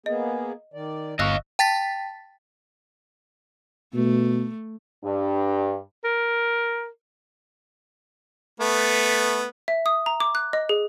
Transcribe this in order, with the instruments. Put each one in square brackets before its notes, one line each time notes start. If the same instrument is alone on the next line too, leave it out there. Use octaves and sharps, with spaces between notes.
[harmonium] A#3 B3 G#4 [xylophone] D#5
[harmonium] D#3 D5
[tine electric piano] G1 C#6 [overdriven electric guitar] D#5 F5 [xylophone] E6 F#6 A#6
[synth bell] G5 A5 A6 B6
[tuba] B2 [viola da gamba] A3
[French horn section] G2
[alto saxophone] A#4
[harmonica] A3 B3
[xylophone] E5
D#6
A#5
D6
F#6
D#5
G#4